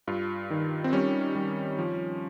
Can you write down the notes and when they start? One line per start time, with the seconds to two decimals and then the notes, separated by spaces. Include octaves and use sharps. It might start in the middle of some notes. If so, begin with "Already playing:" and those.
0.08 G2 F4
0.51 D#3
0.84 C4
0.93 G3 C#4
1.36 G3
1.79 F3